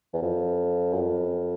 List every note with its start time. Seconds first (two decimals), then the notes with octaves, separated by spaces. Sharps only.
0.13 E2
0.23 F2
0.94 F#2
1.01 F2